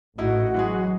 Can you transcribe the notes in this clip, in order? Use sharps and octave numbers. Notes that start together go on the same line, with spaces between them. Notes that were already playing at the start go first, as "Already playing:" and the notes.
A1 A2 D#4 E4 F#4 D#5 F#5
E3 F#3 G#3 G#4